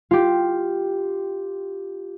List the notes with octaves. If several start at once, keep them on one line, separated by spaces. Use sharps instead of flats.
F4 G4